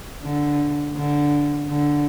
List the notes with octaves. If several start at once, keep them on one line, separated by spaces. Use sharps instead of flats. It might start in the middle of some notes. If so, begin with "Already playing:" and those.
D3
D3
D3